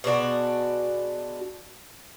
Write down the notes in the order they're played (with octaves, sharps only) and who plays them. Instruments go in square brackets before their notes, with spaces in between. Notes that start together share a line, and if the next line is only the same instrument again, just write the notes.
[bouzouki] B2 G#3 D4 F#4